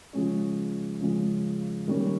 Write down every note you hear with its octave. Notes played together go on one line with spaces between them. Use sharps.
C#3 F3 G#3 C#4
C#3 F3 G#3 C#4
D#3 G3 A#3 C#4